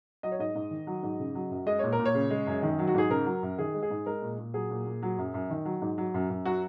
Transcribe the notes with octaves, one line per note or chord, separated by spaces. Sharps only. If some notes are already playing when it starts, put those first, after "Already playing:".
F#3 D#5
C#5
G#2 D#5
G#2
D#3
F#3
G#2
C#3
F#3
F#2
G#3 D#5
A#2 C#5
A#4
A#2
C#5
C#3
G#3
F#2
D#3
F#3
F#4
G#2 G#4
C#3 A#4
F#3
F#2
D#3 G#4
G#3
G#4
G#2
G#3 A#4
A#2
A#2
F#3 G#4
A#2
A#2
F#3
F#2
F#2
D#3
F#3
G#2
F#3
F#2
F#2
F#3 F#4